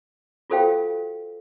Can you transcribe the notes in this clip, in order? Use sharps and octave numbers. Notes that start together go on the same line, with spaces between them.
F4 F#4 A4 C5 F5 G5